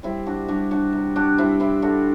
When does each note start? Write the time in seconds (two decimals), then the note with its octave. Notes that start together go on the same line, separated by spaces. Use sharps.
0.03 G3 C4 E4
0.26 D4 F#4
0.48 G3 D4 F#4
0.71 D4 F#4
0.93 C3
1.16 D4 F#4
1.38 G3 C4 E4
1.60 C4 E4
1.82 D3 D4 F#4